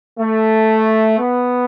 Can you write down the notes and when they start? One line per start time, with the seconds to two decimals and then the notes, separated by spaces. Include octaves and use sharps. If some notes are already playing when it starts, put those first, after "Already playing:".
0.20 A3
1.19 B3